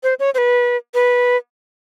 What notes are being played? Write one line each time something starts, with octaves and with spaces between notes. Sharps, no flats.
C5
C#5
C5
B4
B4